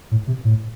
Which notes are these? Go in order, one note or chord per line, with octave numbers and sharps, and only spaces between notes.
A2
C3
A2